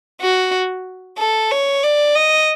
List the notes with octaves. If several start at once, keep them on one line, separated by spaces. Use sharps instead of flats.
F#4
A4
C#5
D5
D#5